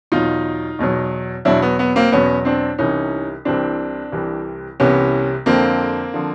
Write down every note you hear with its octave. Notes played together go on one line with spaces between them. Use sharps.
E2 B2 F#3 D#4 F4
E2 B2 F#3
E2 B2 F#3 D4 E4
B3
B3
A#3 C4
E2 B2 F#3 B3 C#4
C4 D4
C2 C3 E3 C#4 D#4
C2 C3 E3 C4 D4
C2 C3 E3
C2 C3 E3 B3 C#4
F2 D3 F3 A#3 C4
D3 F3